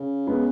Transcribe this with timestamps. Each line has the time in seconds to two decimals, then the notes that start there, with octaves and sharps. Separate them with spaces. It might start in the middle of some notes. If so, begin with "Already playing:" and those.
Already playing: C#3
0.27 G#3 B3